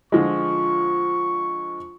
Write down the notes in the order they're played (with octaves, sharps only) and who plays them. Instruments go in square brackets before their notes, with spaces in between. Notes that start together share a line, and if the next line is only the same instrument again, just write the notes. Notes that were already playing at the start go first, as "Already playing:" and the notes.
[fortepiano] D3 F3 G#3 [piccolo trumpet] C#6